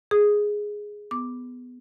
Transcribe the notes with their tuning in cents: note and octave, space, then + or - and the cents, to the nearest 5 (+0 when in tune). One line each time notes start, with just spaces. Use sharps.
G#4 +0 D#6 +0
B3 +10 D6 +0